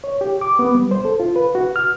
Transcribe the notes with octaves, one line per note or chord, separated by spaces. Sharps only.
C#5
G4
D6
B3
G3
C5
A4
F4
B4
F#4
F6